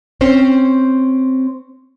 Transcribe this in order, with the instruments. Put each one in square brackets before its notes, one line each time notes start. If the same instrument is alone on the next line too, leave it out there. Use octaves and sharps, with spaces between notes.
[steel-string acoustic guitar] C4 C#4 C5